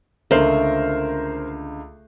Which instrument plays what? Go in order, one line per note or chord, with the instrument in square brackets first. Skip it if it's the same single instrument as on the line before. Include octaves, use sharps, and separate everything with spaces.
[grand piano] C#2 D3 [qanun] A3 [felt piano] A#4 C5